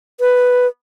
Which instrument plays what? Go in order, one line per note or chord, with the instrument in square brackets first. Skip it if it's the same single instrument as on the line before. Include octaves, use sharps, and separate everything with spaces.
[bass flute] B4